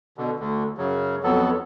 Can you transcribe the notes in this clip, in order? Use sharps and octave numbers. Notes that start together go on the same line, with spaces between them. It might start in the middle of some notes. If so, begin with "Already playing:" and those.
B2 D3
D2 D3
F#2 C#3 F#3
F2 F#3 B3 A4